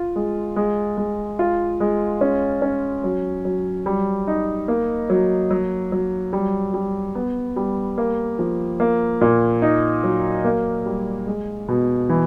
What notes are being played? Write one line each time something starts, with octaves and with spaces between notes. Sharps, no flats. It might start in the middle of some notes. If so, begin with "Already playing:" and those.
Already playing: F4
G#3
G#3
G#3
F4
G#3
C#4
C#4
F#3
F#3
G3
D#4
A#3
F#3
F#3
F#3
G3
G3
B3
G3
A#3
F3
A#3
A#2
D#4
F#3
A#3
G3
G#3
B2
E3